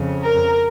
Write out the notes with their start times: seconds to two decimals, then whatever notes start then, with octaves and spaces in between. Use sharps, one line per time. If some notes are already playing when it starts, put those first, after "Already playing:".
Already playing: F2 C#3
0.24 A#4